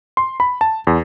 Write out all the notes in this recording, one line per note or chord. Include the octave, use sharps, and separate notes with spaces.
C6
B5
A5
E2